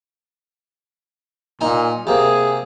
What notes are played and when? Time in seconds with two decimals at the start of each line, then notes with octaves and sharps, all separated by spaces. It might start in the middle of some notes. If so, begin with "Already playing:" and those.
1.61 A#2 D#4 G#5
2.07 C3 A#3 G#4